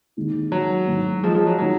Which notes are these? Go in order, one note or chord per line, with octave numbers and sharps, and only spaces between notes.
D#2 D#3 G#3 D#4
F#3
G#2 D#3 G#3
F3 G#3
F3 G#3
F#3
D#3 F#3 G#3 D#4